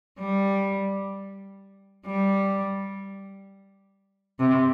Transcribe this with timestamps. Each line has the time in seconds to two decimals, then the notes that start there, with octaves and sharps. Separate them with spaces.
0.20 G3
2.07 G3
4.40 C3